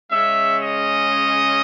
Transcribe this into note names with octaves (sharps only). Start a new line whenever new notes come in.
C#3 G#3 C#4 E5
D#5